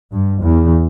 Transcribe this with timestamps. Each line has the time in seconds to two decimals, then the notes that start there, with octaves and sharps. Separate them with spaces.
0.12 G2
0.41 E2